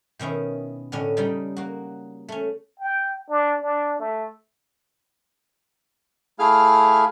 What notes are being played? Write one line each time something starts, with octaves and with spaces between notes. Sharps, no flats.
B2 D#3 C#4 E4
A2 D3 C#4 D#5
C#3 G3 D#4 G5
A#3 F#4
A3 C#4
G5
D4
D4
A3
A3 E4 G#4 F5 F6